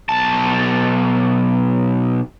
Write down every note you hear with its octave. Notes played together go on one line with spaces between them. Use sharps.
B1 A5